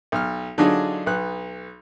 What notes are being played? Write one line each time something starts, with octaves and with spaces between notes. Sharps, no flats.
B1 F6
D3 F#3 D4 D#4 F4 G#4
B1 B3 F#6